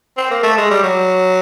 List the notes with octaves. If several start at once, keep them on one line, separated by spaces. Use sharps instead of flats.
C4
A#3
A3
G#3
G3
F#3